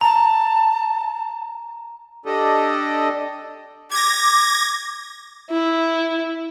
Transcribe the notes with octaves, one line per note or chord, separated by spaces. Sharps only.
A5 A#5
D4 G4 A4 D#5
D6 G#6 A#6
E4